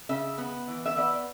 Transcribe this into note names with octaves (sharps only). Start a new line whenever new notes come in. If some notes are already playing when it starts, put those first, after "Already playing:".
C#3 E5
B3
E3
E5
B3 D5